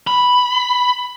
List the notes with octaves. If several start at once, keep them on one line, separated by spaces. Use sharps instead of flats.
B5